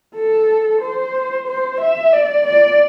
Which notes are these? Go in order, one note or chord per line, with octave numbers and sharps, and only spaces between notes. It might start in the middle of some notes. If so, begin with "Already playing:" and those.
A4
C5
C5
E5
D5
D5